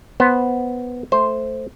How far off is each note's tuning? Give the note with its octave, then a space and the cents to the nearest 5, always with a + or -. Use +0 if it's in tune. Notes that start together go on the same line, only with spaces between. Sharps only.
B3 +0 C5 +0
A3 +0 C5 +0